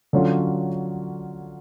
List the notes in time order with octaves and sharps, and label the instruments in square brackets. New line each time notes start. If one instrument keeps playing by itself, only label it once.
[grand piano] D3 F#3 C#4 F4